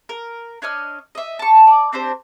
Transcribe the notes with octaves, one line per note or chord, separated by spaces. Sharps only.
A#4
D4 C#5 D#5 F6
D#5 E5
A5 C#6
D5
C4 D4 G4 C5